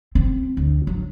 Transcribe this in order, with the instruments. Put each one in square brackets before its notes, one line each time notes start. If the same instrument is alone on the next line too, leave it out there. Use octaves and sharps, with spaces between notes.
[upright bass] C4
D2
F#3